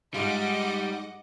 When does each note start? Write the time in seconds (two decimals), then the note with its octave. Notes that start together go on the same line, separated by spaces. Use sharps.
0.14 G#2 G3 F4 D#5 F#5 D6